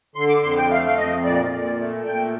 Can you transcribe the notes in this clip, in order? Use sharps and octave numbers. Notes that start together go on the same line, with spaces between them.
D3 C6
D6
F2 C6
G5
A3 F5
F5
F2 D#5
A#2 D5
A#2 D5
A3
A#2 G5